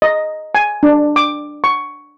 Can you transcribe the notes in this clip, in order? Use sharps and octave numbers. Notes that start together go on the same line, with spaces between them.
D#5
G#5
D4
D6
C#6